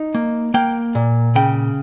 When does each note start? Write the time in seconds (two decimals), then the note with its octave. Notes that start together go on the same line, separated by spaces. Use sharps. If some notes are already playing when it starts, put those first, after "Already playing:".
Already playing: D#4
0.15 A#3
0.54 A#3 G5
0.95 A#2
1.35 C#3 G5